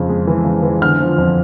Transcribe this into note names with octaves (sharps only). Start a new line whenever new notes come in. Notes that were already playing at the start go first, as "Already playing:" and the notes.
Already playing: F2 C#3
G#3
E3
C#3
E3
D3 F6
F3
F2